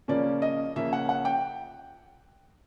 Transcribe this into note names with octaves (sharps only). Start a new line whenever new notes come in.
C#3 F3 A#3 C#4 D5
D#5
C#3 F3 A#3 C#4 E5
F#5
F#5
G5